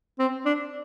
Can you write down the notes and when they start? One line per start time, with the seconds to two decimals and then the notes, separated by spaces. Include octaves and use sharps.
0.19 C4
0.45 D4